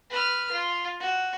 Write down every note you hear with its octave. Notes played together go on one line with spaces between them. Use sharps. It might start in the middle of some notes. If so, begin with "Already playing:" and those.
B4 F6
F4
F#4